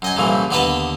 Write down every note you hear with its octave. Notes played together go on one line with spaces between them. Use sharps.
F#2 D#5 G#5
C2 F2 A#2 C#3 E3
D#2 D3 B3 B4 D#5 A5